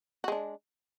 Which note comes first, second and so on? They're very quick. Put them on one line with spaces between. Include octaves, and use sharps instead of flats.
F#4 G#3 D4